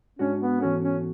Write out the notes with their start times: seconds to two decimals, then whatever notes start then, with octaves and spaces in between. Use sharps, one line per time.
0.19 G#2 G#3 C#4 D4 F#4
0.41 B3
0.61 G#2 E3 B3 C#4 F#4 A4
0.83 C#4